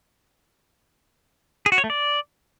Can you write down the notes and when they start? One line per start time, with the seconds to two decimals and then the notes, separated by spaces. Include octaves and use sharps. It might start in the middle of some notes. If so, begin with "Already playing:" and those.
1.66 G#4
1.72 F#4
1.78 C#5
1.84 A3
1.90 D5